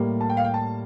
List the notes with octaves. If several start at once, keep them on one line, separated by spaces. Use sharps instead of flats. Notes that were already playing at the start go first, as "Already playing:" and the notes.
Already playing: A2 G3 A#3
A5
G5
F5
G5
A5